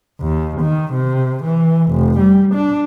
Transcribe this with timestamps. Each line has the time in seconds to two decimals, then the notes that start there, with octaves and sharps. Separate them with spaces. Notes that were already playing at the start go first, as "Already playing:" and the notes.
0.21 D#2
0.61 D#3
0.93 C3
1.44 E3
1.91 F1
2.19 G3
2.55 D4